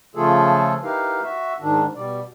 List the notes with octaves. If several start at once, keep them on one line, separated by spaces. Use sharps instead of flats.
C#3 F3 A3 F4 G#4 A4
D#4 E4 G4 A#4 B4 F5
F#4 E5
G#2 D#3 D4
B2 G3 D5